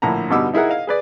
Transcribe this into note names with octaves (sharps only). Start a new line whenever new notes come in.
A#1 A2 D3 A#5
G2 B2 D3 D#4 D6 E6
D#4 E4 G#4 A#4 F#5
D#5 F5
G#4 B4 D5